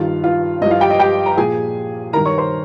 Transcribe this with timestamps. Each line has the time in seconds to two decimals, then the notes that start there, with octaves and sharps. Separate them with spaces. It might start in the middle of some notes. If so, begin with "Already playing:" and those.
Already playing: G2 D#3 F4 F5
0.24 F4 F5
0.61 G2 D#5
0.66 F3
0.71 F4 F5
0.81 G4 G5
0.90 D#5
1.00 G4 G5
1.26 A#5
1.37 A#2 F3 G#4 G#5
2.13 G2 D#3 A#4 A#5
2.26 C#5 C#6
2.38 C5 C6